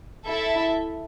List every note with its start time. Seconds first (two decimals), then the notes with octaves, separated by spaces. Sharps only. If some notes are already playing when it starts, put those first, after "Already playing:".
0.24 E4 A4 E5